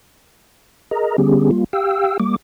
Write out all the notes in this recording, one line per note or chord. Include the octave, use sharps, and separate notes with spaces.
G#4 A#4 D#5 A#5
D3 G3 B3 C#4 G4 G#4
G3 A#3 F4
G4 F5 G5 E6
G3 A#3 D6